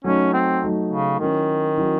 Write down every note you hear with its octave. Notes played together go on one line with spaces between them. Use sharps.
F#3 A3 C#4 D#4
C4
F#3 A3 D#4
C#3
D#3 F#3 C#4 E4
F#3 C#4 E4